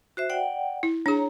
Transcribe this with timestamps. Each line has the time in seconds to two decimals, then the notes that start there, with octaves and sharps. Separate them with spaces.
0.17 F#4 C5 E5
0.30 D5 F#5 G5
0.83 E4
1.06 D4 G#4 C#5 A#5